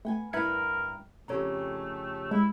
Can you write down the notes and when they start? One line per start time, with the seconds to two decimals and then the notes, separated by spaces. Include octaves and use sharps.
0.05 A3 B3 G5 G#5
0.33 G2 E4 A#4 B4 E5 G#6 C#7
1.28 F2 C#3 A3 G4 A4 C#5 A#5
2.31 G#3 E4 F5